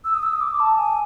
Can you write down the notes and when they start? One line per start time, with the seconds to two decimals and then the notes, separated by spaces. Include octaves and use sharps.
0.05 E6
0.14 D#6
0.23 E6
0.33 D#6
0.41 D6
0.60 A5
0.78 G#5